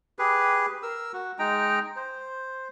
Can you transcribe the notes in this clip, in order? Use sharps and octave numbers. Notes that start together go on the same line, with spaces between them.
G4 G#4 B4
A#4 E6
F#4
G#3 D#4 G5 A#5
C5